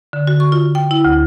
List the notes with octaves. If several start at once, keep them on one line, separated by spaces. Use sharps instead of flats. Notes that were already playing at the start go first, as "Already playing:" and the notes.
D3
F#4
C#6
F4
G5
E4
D2